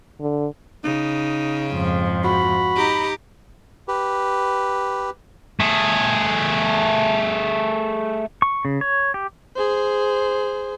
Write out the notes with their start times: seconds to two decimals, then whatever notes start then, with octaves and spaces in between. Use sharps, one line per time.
0.20 D3
0.84 C#3 D#4
1.72 F2 G#2 F3
2.24 F#4 B5
2.76 D#4 G4 A#5
3.88 G4 B4
5.60 A3 G#4
8.42 C#6
8.65 C#3
8.81 C#5
9.14 G4
9.56 G#4 C5